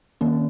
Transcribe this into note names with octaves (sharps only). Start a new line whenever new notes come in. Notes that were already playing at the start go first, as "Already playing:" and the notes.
D#3 A#3 C#4